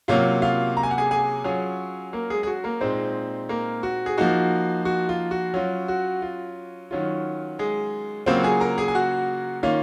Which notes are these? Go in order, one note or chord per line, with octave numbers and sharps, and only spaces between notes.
C3 F#3 A#3 C#4 F4 F5
F4 F5
A#5
G#5
F#5
G#4 G#5
G#4 G#5
F#3 C#4 F4 G#4 G#5
A#3 A#4
G#3 G#4
G#4
F#4
A#3 A#4
A#2 G#3 C4 D#4 C5
A#3 A#4
F#4
G#4
F3 A#3 D#4 F#4
F#4
F4
F#4
F#3 C#4 F4
F#4
F4
D#3 F#3 C#4 F4
G#3 G#4
C#3 F#3 A#3 C4 F4 C5
G#4 G#5
A#4 A#5
G#4 G#5
G#5
F#4 F#5
D#3 A#3 C#4 F4 F5